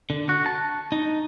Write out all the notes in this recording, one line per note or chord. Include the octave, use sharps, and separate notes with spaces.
D3
F#4
A5
D#4